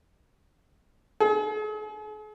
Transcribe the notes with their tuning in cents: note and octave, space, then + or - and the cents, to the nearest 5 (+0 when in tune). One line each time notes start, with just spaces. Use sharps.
G#4 +45